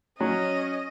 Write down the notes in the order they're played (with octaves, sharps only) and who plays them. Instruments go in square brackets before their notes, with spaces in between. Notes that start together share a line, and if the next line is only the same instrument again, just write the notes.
[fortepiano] F#3 [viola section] C#4 [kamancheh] D#5